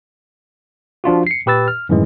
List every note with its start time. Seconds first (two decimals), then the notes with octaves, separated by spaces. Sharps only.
1.04 F3 D4 F4 F#4
1.27 C7 C#7
1.46 A#2 G4 B4 E6 A6
1.68 F6
1.89 F#2 A2 D#3 E3 G#3